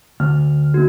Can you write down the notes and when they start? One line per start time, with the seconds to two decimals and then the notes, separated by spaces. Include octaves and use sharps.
0.20 D2 F6
0.74 A#3 D#4 F#4